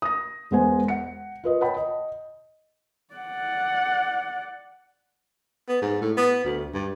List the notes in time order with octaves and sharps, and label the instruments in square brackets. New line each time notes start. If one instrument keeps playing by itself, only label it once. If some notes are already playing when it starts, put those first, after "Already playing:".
[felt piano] D#6 A#6
E1 G#3 B3 C5 G#5
F#5 C#7
F4 B4 D#5
C#5 F#5 G5 A5 B5
D#5
[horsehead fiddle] D5 F#5
[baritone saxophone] B3
G#2
A2
B3
D2
G2